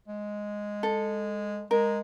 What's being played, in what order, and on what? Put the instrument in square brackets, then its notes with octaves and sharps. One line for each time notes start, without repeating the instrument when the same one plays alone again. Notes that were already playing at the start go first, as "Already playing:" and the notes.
[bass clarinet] G#3
[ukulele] A4
[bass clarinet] G#3 [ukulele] A#4